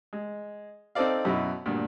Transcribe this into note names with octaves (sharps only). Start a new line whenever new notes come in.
G#3
C4 D#4 A4 C5 D5 F5
F#2 B2 E4
D2 G2 A#2